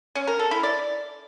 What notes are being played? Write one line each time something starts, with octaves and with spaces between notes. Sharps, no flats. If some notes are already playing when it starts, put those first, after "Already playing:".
C#4
A#4
A4
E4
D5